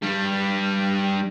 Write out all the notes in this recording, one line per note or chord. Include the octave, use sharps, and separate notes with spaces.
G2 G3